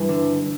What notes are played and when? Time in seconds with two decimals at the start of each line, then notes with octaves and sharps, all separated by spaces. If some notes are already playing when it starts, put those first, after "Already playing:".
Already playing: G2 E3
0.09 D3